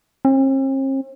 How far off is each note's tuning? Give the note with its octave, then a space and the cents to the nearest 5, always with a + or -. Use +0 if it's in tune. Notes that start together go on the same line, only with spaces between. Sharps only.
C4 +45